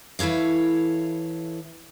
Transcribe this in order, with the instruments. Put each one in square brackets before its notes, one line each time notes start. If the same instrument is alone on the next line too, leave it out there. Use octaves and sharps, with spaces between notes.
[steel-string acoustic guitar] E3 E4 A4 C#5 F5